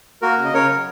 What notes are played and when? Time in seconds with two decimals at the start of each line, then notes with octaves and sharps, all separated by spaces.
0.22 A#3 F#4 A#4
0.37 C#3
0.45 D#5
0.54 C#3 A#4 C#5
0.69 F#3